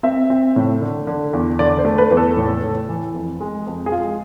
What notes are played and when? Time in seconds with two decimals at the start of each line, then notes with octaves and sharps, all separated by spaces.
0.03 C4 E5
0.30 C4
0.56 A2
0.81 D3
1.07 D3
1.33 E2
1.59 D3 D5
1.78 C5
1.85 A3
1.98 B4
2.11 E2 B4
2.17 A4
2.37 A2
2.63 A2
2.89 E3
3.14 F2
3.40 G#3
3.67 F2
3.86 G#4
3.92 G#3 F4